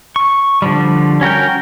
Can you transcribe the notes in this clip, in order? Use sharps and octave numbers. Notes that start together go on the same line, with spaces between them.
C#6
D3 F3 G3
C#4 F#4 A#4 G5